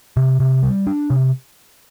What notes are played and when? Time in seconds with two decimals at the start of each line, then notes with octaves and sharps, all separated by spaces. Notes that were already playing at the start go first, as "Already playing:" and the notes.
0.17 C3
0.40 C3
0.63 G3
0.87 D4
1.10 C3